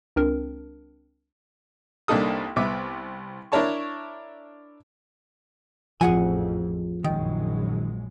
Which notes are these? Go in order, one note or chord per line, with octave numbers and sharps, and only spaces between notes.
C#2 C4 D4 A#4
C2 A#3 D4 D#4 A4 D#6
C2 B3 E5 D6
D4 E4 A#4 C#5 A5 C#6
A1 F2 F3 G#4 F#5 G#5
A#1 F#2 D#3 G#3